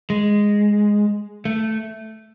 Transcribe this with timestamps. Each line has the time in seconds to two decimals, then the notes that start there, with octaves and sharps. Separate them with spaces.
0.10 G#3
1.45 A3